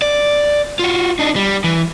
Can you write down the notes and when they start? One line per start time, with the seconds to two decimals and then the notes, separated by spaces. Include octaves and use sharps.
0.02 D5
0.79 F4 F#4
1.19 D4 D#4
1.36 G3
1.64 E3